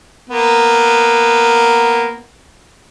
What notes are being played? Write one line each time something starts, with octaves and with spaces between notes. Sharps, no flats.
A#3 B3